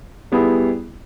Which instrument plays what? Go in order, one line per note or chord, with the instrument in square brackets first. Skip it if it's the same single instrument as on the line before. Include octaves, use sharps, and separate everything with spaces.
[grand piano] G3 B3 E4 G#4